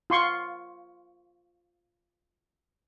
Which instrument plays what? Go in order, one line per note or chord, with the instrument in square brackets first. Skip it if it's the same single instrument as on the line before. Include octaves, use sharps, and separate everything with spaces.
[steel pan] F4 C6 C#6